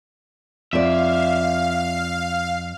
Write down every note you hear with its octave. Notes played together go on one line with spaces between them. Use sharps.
F2 D5 E5 F5